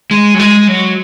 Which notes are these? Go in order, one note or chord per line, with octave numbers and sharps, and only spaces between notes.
G#3
F#3
G#3
F#3